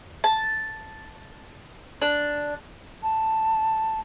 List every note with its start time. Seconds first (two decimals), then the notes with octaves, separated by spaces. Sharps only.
0.24 A5
2.02 D4
3.03 A5